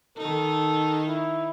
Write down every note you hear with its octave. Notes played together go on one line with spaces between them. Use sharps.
D#3 D#4 A4
E4